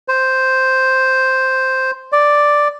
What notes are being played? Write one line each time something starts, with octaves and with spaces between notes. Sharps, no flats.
C5
D5